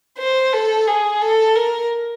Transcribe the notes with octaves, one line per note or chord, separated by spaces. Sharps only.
C5
A4
G#4
A4
A#4